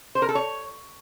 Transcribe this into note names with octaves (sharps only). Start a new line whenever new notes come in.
C5
A#4
A4
C#5